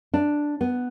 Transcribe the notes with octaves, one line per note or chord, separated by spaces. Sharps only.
D4
B3